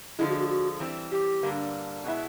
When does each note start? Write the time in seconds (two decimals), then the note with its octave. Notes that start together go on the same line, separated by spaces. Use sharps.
0.18 D3 F3 G#3 E4
0.29 F#4
0.39 F#4
0.50 F#4
0.80 E3 G3 C4
1.11 G4
1.43 G2 D3 G3 A#3 D4
2.04 B2 G#3 B3 E4